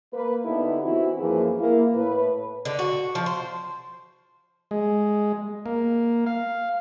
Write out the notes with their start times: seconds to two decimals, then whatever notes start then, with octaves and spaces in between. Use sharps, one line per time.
0.14 A#3 B4
0.45 D3 B3 D#4 E4 G4 A4
0.83 E3 C4 E4 F#4
1.20 F#2 E3 F3 A#3 G#4 B4
1.60 A#3 E4
1.95 A2 B4
2.65 D3
2.79 F#4
3.15 F3
3.26 C5
4.71 G#3
5.66 A#3
6.26 F5